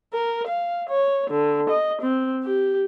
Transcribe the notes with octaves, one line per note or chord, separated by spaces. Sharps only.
A#4
F5
C#5
D3
D#5
C4
G4